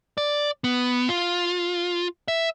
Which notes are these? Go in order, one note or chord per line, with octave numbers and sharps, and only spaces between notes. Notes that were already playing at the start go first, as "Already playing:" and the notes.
D5
B3
F4
E5